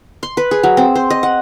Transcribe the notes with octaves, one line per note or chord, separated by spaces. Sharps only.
C6
B4
G#4
F#3
C4
C5
D#5
F#5